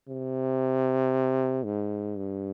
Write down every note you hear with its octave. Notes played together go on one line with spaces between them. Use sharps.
C3
G#2
G2